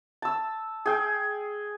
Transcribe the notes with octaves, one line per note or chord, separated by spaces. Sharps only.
A5 E6
G#4 G5